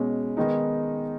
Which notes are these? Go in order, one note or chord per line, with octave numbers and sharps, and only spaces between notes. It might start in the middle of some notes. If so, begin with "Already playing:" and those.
Already playing: B2 G#3 C#4
D#3 G#3 B3 D#4